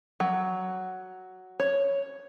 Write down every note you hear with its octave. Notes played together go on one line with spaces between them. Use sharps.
F#3
C#5